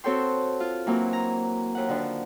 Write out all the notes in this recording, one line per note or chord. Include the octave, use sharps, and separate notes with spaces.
C4 F#4 A4 C#5 G5 C6
F4
E3 F#3 A#3 C4
A#5
D#2 F#5
D3 D#3 F3